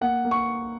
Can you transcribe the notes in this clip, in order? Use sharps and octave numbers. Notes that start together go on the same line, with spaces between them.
A#3 F#5
A#3
C#6